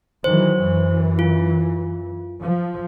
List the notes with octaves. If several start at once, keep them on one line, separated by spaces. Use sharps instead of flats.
D#3 E3 F#3 C5
F#2 E3
F4
F3